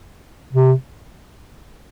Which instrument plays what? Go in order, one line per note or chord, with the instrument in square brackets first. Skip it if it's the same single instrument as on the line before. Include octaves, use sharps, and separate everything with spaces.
[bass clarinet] C3